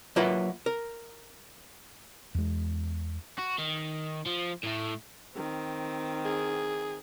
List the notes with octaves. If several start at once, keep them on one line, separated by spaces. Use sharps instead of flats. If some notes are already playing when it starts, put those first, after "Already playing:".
F#3 A#3 F4 B4 E5 F#5
A#4
E2 G#3
F#4
D#3
F3
A2 A3
D#3 C4
G#4